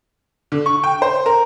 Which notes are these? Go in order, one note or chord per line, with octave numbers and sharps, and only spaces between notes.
D3
C#6
G5
C5
A#4